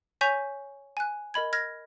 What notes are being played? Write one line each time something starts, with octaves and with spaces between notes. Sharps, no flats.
C#5 G#5 C#6 G6 B6 F7
G#5 F#6
A#4 D#5 B5 G#6
F6 G#6 A#6